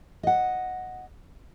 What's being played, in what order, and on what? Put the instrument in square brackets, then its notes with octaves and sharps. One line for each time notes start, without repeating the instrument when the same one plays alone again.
[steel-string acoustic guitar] D#5 F#5